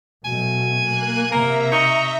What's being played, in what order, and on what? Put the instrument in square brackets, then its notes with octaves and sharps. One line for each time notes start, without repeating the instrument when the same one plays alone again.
[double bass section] B2 F#3 A3 [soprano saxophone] G#5
[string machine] A#3 F#6
[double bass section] C3 [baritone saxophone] A#3 [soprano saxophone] A#4 [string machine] E5 A#5
[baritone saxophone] D#4 [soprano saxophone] C#6